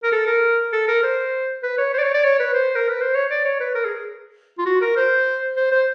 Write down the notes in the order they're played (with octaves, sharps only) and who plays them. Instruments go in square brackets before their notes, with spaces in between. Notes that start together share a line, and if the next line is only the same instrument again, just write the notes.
[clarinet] A#4
A4
A#4
A4
A#4
C5
B4
C#5
C5
D5
C#5
D5
C#5
B4
C5
A#4
B4
C5
C#5
D5
C#5
B4
A#4
G#4
F4
F#4
A#4
C5
C5
C5